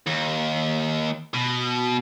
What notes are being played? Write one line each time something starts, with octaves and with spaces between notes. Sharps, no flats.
D#2
B2